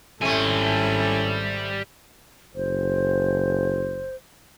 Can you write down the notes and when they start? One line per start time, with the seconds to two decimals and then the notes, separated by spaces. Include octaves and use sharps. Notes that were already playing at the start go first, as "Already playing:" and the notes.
0.21 G#1 C3 G3 A3 C#4 E4 A4 G#5
2.55 F#1 C5